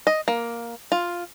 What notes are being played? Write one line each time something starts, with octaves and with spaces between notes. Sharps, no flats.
D#5
A#3
F4